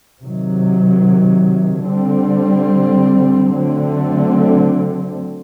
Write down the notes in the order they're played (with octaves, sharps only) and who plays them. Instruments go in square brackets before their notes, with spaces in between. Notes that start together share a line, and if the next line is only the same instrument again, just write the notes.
[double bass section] C3 D#3 F#3
D3 G3 C4
D3 F#3 A3 C4